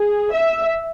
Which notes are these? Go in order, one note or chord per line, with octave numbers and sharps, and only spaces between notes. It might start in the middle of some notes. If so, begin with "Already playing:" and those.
Already playing: G#4
E5